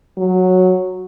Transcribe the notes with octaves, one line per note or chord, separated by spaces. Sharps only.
F#3